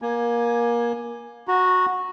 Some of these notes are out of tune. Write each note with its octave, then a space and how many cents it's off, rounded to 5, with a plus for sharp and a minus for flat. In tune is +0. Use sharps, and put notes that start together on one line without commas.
A#3 +25 G#5 +0
F#4 -10 A#5 +0